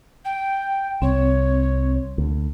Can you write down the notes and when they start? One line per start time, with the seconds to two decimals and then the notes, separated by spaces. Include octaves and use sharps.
0.24 G5
1.02 C2 C4 C#5
2.18 D2